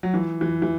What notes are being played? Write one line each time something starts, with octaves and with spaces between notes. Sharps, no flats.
F#3
E3
E3
E3